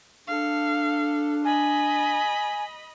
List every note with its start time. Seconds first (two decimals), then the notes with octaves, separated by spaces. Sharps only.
0.27 D4 A4 F5
1.45 D#5 G#5 B5